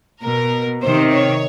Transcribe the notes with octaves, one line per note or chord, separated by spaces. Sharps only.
B2 A#4
C3 D#3 C5
C#5